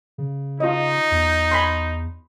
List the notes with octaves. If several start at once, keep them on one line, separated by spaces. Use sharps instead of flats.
C#3
D#4 F4 D#5
E2
G#5 B5 C6